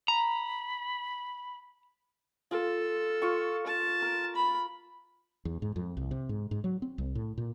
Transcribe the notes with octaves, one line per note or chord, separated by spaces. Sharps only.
A#5 B5
F4 A4
F4 C#6
A5
A#4
B5
E2
G#2
F2
C2
C3
G#2
G#2
F#3
C4
C2
A2
A#2